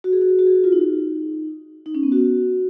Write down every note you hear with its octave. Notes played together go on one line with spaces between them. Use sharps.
F#4
G#4
F#4
G#4
F#4
G#4
F#4
F4
D#4
D#4
C#4
B3
F#4